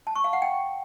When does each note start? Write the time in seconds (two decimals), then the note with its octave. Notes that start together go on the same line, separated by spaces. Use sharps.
0.07 A5
0.15 C#6
0.24 F5
0.33 F#5
0.42 G5